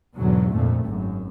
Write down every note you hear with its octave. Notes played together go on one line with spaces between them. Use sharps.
E2 G#2 B2 D3 F#3
F2 A#2 A3
G#1 F#2